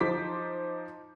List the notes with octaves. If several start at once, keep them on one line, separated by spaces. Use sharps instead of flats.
F3 D#4 C5 D6 B6